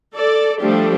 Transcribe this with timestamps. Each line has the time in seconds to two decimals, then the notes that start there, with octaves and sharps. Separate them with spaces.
0.14 A4 D5
0.60 F3 G3 A3 D4 G4 A4